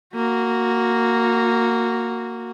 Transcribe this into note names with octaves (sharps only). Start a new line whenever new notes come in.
A#3 F#4